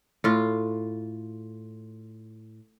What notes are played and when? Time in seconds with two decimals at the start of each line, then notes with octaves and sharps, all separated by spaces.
0.24 A2 F4